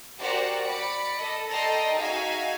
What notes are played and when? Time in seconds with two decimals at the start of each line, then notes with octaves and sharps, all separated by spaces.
0.19 F#4 G4 A#4 C5 D5 F#5
0.64 D5 B5 C#7
1.18 A4 D#5
1.50 A4 D5 D#5 G5 A#5 C6
1.95 D#4 F#4 G#4 E5 F5 G#5